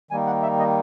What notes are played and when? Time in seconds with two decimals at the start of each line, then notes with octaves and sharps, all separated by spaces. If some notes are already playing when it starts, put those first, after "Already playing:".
0.11 D#3 G3 A#3 D#4 G#5
0.27 F#5
0.43 E5
0.59 D#5